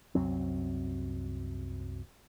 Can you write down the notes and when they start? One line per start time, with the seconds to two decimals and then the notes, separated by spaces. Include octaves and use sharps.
0.15 C2 F#2 F#3 C4